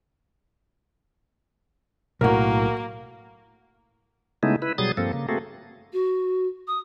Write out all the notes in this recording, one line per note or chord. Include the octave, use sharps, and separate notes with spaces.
B1 A2 A#3 F#4 A#4
C#3 G#3 A3 B3 D#4 E4
E4 B4
B2 F#3 G3 G#4 D#6 A6
G2 F3 A#3 C4 A4
C#3 A#3
A3 A#3 C4 F#4 G#4 A4
F#4
D#6